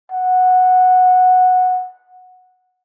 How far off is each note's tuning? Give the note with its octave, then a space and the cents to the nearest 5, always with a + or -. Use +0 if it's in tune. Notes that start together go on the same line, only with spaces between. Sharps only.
F#5 -10